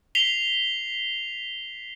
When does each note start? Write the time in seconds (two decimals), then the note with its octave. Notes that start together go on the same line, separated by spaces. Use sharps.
0.15 B6 C7 F7 G7